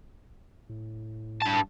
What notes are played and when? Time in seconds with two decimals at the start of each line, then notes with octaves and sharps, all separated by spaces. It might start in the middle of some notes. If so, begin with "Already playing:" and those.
0.69 A2
1.42 G2 A5